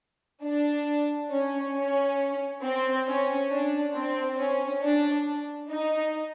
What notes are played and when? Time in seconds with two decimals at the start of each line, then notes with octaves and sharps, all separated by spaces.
0.42 D4
1.30 C#4
1.74 C#4
2.62 C4
3.06 C#4
3.49 D4
3.94 C4
4.37 C#4
4.81 D4
5.69 D#4